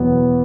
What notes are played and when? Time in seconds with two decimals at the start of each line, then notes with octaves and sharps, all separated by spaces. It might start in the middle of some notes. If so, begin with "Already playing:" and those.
Already playing: E2 B2 F#3 B3